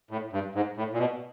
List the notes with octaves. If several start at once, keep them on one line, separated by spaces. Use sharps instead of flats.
A2
G2
G#2
A2
A#2
B2